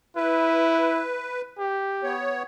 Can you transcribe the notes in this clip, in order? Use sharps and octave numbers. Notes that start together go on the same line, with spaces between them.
E4 B4
G4
B3 C#5